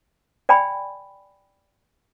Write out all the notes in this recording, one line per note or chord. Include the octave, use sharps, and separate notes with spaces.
D5 G5 G#5 B5